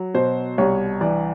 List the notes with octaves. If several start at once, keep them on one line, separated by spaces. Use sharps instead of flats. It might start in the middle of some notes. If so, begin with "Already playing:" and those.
Already playing: F#3
B2 C5
C2 C#5
E3 D5